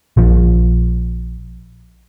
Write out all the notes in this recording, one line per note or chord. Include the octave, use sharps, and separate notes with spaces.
A#1 F3